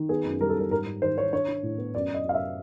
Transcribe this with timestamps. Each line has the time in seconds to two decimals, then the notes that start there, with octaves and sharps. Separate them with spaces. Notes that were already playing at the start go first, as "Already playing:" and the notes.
Already playing: D#3
0.09 B3 G#4
0.25 F#2
0.41 G3 A#4
0.49 A4
0.56 G3 A#4
0.71 G#2 A#4
0.87 G#2
1.02 D#3 C5
1.17 D#3 C#5
1.33 D4 C#5
1.48 D4
1.63 A2
1.78 B3
1.95 F#2 D5
2.09 F#2
2.14 D#5
2.24 F#2 F5
2.35 E5